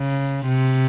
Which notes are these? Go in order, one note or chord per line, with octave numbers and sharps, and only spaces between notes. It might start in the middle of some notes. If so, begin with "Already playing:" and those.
Already playing: C#3
C3